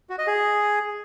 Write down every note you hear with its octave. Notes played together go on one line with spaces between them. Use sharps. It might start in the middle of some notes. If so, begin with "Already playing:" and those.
F#4
D#5
G#4